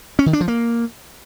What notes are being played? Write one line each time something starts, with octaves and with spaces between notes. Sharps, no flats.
C#4
D#3
D4
F3
A#3